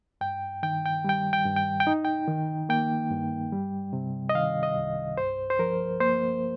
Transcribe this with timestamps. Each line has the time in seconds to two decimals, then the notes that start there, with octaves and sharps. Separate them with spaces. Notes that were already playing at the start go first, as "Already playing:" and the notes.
0.21 G2 G5
0.63 D#3 G5
0.86 G5
1.04 G3 G5
1.33 G5
1.45 G2
1.56 G5
1.80 G5
1.87 D#4
2.05 G5
2.28 D#3
2.69 A#3 G5
3.11 G2
3.52 G3
3.93 C3
4.29 D#5
4.35 D#3 F5
4.63 D#5
4.76 C2
5.17 G2 C5
5.50 C5
5.59 F3 A#4
6.00 A#3 C5